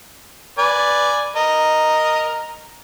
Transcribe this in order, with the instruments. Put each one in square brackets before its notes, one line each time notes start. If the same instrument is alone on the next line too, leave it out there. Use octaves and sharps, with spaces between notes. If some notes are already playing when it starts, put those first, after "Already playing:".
[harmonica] B4 D5 G#5
A#4 D#5